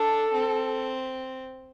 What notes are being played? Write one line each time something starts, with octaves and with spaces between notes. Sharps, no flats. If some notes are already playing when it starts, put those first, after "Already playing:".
Already playing: D4 A4
C4